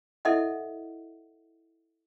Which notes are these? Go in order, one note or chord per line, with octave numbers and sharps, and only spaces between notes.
E4 A4 D#5 E5 F#5